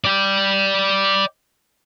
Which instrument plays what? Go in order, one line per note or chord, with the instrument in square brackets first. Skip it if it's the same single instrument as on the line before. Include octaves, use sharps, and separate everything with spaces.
[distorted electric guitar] D5 G5